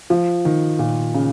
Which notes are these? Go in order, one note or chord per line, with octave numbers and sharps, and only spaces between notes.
F3
D#3
A#2
C#3